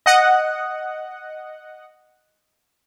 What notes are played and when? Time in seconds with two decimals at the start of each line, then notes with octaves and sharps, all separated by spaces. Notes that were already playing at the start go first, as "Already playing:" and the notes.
0.06 D#5 F#5